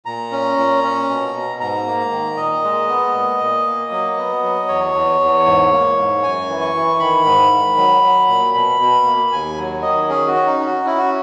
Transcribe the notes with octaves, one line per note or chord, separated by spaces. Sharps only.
A#2 A#5
C#4
A#2
C#4
B2
B2
G#2 A#5
A#3
D#3
A#2 D#5
G#3
B3
A#2
A#2
A#3
F#3
B3
F#3
E2 C#5
E2
E2
G#2
A#3
G#2
F#2 G#5
E3
C#6
E3
D#3 B5
G#2
D#3
F#3
F#3
A#2
B2 B5
B2
A#3
D#2 G#5
F#3
D#3 D#5
C#4 G#4
F#4
C#4
D#4
C#4
F#4
C#4 E4
F#4